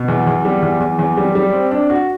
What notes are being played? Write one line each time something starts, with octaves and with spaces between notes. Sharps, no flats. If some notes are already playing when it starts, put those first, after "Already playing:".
Already playing: B2
E2
E2
G3
E2
E2
E2
G3
G3
C4
D4
F#4